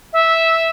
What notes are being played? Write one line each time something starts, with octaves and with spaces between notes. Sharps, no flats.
E5